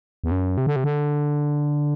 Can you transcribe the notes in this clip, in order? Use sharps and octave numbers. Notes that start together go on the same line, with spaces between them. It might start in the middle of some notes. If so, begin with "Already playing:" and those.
E2
F#2
C3
D3
C3
D3